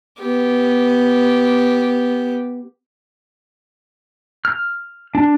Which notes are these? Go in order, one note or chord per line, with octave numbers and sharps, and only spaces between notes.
B3 G4
F6
D4